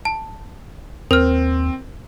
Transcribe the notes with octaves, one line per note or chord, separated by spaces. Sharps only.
A5
D#2 C4 A#4 F6